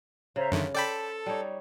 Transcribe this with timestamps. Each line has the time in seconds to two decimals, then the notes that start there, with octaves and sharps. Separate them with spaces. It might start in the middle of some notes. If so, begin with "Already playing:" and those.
0.36 C#3 C5 E5 A#5
0.52 F#2 D3 D#3 E5
0.75 A4 C5 D5 G5 A5 B5
1.26 G3 D#4 C#5